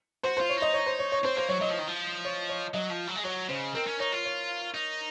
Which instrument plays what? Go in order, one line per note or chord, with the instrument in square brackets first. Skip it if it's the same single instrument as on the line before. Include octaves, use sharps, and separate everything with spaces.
[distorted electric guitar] F#4 [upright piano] C5
[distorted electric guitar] F4 [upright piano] C5
[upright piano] C#5
[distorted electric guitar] D#4 [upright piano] D#5
[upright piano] C#5
C5
C#5
C#5
[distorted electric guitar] C4 [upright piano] C5
[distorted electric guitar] A#3 [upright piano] C5
[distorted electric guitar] F#3 [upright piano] C#5
[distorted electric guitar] F#3 [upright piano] D#5
[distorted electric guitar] F3
D#3
F3
[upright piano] C#5
C#5
[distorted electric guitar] F#3 [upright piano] D#5
[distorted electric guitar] F3
F#3
G#3
[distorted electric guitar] F#3 [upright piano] C#5
[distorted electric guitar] C#3 [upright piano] C5
[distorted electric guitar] C4 [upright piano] A#4
[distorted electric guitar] C#4
[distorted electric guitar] D#4 [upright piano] C#5
[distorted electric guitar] F4
[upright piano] C#5
[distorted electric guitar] D#4